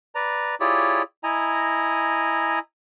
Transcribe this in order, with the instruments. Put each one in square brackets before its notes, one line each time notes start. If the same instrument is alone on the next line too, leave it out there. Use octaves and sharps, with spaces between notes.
[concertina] B4 D5 A#5
E4 F4 G4 G#4 C#5 D5
E4 D#5 G#5 A#5